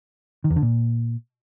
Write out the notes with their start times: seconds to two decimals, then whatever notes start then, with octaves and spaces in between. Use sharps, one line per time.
0.44 D#3
0.50 E2
0.56 D3
0.62 A#2